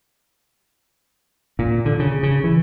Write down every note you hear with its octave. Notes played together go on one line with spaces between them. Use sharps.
A#2
D3
C#3
C#3
E3